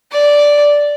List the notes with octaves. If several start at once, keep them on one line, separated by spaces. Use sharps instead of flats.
D5